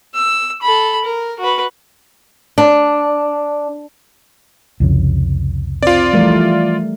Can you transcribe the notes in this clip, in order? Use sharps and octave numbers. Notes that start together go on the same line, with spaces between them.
E6
A4 B5
A#4
F#4 B4
D4
C2 F2 C#3
C4 F4 D5
E3 F3 G3 A3 A#4